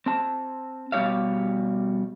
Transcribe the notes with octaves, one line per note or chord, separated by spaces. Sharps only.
C4 A5
B2 G3 C#4 G4 C#5 F5